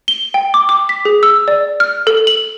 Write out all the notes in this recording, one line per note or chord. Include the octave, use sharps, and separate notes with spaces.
G7
G5
D6
D6
B6
G#4
E6
D5
F6
A4
F#7